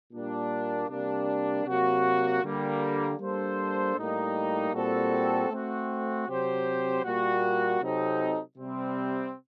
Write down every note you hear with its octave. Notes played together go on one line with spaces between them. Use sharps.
A#2 G3 A#3 D4
C3 G3 A#3 D4
C3 F#3 A#3 F#4
D3 G3 A#3
G3 A#3 D4 A4 C5
A2 G3 A#3 D#4
A#2 G3 C4 F#4 A4
A3 C4 F#4
C3 F#3 C4 G4 C5
A#2 G3 A#3 F#4
C3 F#3 C4 D#4 A4
C3 G3 C4